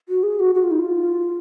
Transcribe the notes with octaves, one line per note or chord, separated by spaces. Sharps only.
F#4
G#4
F#4
F#4
F4
D#4
F4